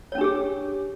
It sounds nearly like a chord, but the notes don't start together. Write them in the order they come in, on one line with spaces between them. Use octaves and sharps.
C#5 C#4 D4 G4 G#4